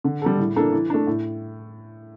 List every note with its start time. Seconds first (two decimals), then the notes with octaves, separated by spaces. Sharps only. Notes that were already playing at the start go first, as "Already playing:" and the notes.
0.04 D3
0.22 G3 D4 A4
0.39 A2
0.56 E3 A#3 D4 A4
0.73 E3
0.90 A3 D4
1.07 A2